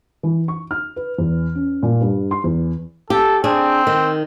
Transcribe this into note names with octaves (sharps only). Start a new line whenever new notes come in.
E3
C#6
F6
B4
E2
C#4
A#2
G2
C6
E2
G4 A4
C4 D4 G#4
D#3